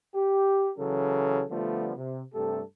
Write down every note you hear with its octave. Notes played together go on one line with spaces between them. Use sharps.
G4
C#3 E3 F#3 C#4 A4
D3 F3 G3 A3 B3 F4
C3
G2 C3 A3 G4 A4